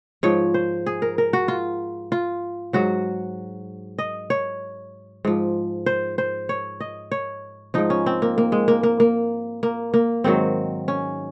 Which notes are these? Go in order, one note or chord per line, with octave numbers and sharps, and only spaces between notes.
G#2 F3 C#5
C5
G#4
A#4
A#4
F#4
F4
F4
G#2 F#3 F#4
D#5
C#5
G#2 F3
C5
C5
C#5
D#5
C#5
G#2 F3 D#4
C#4
C4
A#3
A#3
G#3
A#3
A#3
A#3
A#3
A#3
G#2 D#3 F#3 C4
C#4